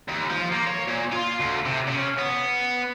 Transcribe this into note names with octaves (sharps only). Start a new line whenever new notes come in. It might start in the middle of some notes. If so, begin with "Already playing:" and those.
D#2
F3
A#3
C#5
A#2
F4
D2
C3
C#3
B3